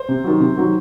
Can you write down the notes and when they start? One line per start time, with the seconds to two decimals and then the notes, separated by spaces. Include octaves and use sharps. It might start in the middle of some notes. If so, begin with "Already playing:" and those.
Already playing: C5
0.09 C3
0.24 D#3 F#3
0.40 C3
0.56 D#3 F#3